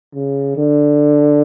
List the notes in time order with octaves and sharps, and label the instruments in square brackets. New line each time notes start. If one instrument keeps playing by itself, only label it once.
[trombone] C#3
D3